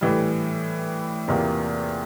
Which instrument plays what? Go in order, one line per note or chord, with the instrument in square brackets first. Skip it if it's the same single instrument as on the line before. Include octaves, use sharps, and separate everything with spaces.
[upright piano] A2 E3 G3
E2 C3 E3 A#3 F4